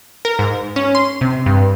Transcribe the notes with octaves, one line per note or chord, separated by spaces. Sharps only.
A#4
G#2
C#4
C6
C3
G2